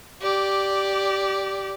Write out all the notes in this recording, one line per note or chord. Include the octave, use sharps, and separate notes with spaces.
G4 D5